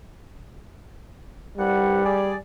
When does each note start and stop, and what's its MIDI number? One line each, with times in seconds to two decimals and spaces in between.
1.57 2.01 36
1.57 2.01 43
1.57 2.36 55
1.57 2.01 78
2.04 2.33 68
2.04 2.33 74